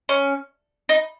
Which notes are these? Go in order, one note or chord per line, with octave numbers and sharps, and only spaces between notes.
C#4
D#4